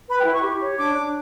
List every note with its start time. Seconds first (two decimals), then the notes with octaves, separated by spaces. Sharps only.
0.08 B4 B5
0.20 G5
0.26 E4
0.32 C#6
0.43 G4
0.61 C#5
0.78 D4 D6
0.96 D4